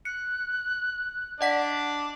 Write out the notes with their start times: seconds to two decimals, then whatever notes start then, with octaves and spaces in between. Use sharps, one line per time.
0.05 F#6 C#7
1.41 D4 D5 D#5 F#5 B6